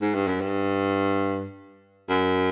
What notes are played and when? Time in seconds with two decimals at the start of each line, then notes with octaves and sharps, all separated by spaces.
0.02 G#2
0.15 G2
0.28 F#2
0.41 G2
2.09 F#2